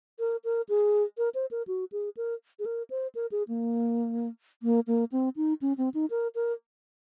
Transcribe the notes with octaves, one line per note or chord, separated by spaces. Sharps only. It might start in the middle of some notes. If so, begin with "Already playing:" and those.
A#4
A#4
G#4
A#4
C5
A#4
F#4
G#4
A#4
G#4
A#4
C5
A#4
G#4
A#3
A#3
A#3
C4
D#4
C#4
C4
D#4
A#4
A#4